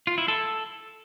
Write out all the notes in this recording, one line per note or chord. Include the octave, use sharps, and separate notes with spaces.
F4
E4
A4